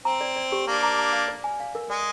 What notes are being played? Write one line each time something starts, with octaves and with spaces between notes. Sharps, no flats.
C4 A#5
D5
D5
G4
A#3 D4 F5
A#5
A#5
F5
D5
G#5
F5
A#4
G#3 D5